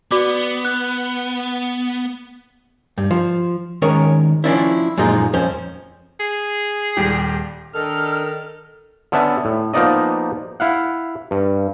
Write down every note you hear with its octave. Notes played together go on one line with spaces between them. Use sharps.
B3 F#4 D5 D6
F#6
G2
F3
D#3 G#3 C#4 A#4 C#5
F3 C#4 D4 E4
F#2 A#2 F3 G#3 D#4 F4
F2 C#4 C5
G#4
D#1 G3 G4
D#3 D4 A4 A#4 D#5 F6
D3 B3 C#4 A4 E5 A5
A2
F3 A#3 B3 D#4 D5 D#5
E4 F5 F#5
G2